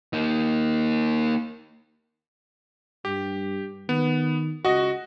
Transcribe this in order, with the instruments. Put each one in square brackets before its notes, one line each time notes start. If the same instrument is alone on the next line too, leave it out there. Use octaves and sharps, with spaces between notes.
[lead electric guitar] A#3 D#4
[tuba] G2 [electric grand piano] G4
[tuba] D#3 [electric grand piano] B3
[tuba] C#2 [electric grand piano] F#4 D#5